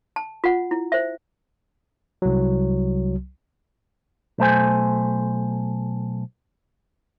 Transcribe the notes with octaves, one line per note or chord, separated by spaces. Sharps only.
A5
F4 F#5
E4
C5 E5
C2 F#3
B1 A3 C5 G#5